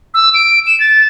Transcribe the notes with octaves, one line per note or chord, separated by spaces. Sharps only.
E6
D7
E7
A6